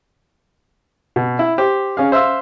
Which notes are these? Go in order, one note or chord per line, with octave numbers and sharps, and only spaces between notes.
B2
E4
G4 C5
C#4 G#4 F5
C5 E5 F5 C6 E6